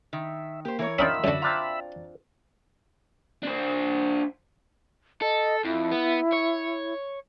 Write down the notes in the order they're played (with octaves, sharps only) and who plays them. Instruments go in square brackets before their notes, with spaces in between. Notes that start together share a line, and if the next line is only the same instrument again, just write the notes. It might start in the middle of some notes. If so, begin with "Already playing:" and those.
[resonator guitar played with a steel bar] D#3 [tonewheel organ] E5
[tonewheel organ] A#3 [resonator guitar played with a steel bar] G4 C5
[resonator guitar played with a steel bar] E3 A#4 C#5
[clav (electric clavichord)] D#3 F4 [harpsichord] C#4 D4 D5 [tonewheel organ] E5 B5 E6
[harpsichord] F#2 D3 [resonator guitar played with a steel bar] F#4 D5
[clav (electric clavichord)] C4 D4 F4 [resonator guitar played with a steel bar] D5 A#5
[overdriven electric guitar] D4 C5
[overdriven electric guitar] A4 [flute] D#5
[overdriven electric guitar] F2 [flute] E4
[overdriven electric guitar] B3
C#5